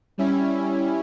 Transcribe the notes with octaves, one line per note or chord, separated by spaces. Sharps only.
G3 C#4 E4